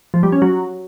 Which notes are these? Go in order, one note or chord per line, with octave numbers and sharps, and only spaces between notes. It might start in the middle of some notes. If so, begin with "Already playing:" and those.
F3
G3
C#4
F#3